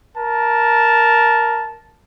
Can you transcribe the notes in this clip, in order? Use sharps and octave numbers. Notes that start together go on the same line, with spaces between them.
A#4 A5